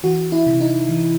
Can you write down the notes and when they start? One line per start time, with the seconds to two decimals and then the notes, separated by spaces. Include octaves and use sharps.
0.03 E3 F#4
0.32 E4
0.47 C3
0.60 D#4
0.89 E3